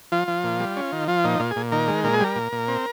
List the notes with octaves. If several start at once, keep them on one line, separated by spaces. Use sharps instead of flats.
F3 F4
F3
A#2
G3
C#4
D#3
F3 F4
A#2 D#4
A#2 F4
G#4
A#2
D#3 A#4
G#3
A#2 A#4
G#4
G3 A#4
A#2
A#2
C4